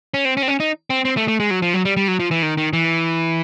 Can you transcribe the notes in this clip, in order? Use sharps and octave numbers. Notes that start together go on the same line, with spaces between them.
C#4
C4
C#4
C4
C#4
D#4
C4
C4
A3
A3
G#3
F#3
F3
F#3
G3
G3
F#3
F3
E3
D#3
D#3
E3